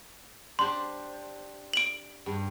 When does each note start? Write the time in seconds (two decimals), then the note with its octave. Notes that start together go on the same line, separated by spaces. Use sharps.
0.59 D4 G4 C5 C6
1.73 D7 F#7
2.26 G2